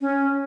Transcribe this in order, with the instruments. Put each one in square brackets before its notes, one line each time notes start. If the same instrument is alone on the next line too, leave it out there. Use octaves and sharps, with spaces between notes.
[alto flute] C#4